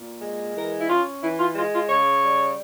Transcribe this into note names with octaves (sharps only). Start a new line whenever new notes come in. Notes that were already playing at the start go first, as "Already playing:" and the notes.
Already playing: A#2
G#3
E3 A#4
E4
C#4 F4
E3 E4
F4
G#3 F4
F4
C#3 C#5
G3